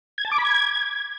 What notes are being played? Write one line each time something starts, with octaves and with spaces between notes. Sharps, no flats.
G#6
A5
D6
B5
G#6